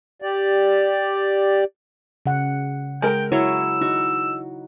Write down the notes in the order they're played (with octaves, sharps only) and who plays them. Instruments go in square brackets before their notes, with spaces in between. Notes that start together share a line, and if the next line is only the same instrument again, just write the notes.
[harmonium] G4 D5
[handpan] C#3 F#5
[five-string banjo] G#3 A#4 [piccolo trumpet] G5
[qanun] F#3 E4 C#5 [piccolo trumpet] E6
[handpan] D#4 [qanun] F#4